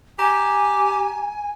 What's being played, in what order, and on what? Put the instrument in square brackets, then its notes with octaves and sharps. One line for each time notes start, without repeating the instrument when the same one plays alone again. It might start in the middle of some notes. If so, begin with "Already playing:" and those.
[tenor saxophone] G4 [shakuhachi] G#5 [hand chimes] A#5